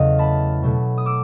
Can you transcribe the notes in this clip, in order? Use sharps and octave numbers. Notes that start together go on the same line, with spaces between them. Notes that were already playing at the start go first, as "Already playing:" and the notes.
Already playing: E2 C#3 F#3 A3 D#5 F5
A5 B5
B2 F#3 A3
D#6
D6 E6